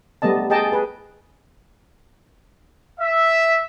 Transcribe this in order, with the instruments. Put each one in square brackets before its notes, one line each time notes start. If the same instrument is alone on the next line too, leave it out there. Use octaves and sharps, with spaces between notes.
[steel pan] G3 A3 B3 D#5 A5
G#4 D#5 G5 A5
G#4 B4
[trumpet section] E5